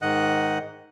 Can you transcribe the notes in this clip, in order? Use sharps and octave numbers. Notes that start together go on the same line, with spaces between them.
G#2 D#3 D#5 F#5 F#6